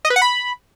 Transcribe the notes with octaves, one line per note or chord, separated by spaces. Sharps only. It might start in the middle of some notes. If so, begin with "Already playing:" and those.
D#5
B4
F#5
B5